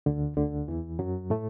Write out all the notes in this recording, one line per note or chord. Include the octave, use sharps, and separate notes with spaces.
D2 D3
D2 D3
E2 E3
F#2 F#3
A2 A3